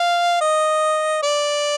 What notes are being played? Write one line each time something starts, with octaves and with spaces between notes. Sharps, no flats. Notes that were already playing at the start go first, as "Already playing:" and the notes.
Already playing: F5
D#5
D5